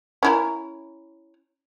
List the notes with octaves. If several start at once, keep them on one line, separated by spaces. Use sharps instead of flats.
C#4 E4 A#4